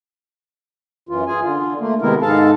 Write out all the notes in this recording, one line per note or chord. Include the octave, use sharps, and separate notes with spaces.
F#2 E3 F4
F4 G#4 G#5
D3 F4
A3 A#3
C3 D#3 G#3 B3 E4 A#4
G#2 G#3 A4 F5 A5